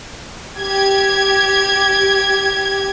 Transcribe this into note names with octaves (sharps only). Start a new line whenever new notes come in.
G4 G#6